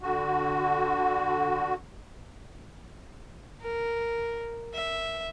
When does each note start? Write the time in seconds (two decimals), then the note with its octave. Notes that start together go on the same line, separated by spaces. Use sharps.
0.02 D3 F#4
3.61 A#4
4.74 E5